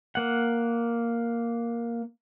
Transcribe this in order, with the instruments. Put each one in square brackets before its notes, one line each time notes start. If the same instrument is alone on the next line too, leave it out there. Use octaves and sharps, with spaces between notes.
[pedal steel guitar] A#3 F#5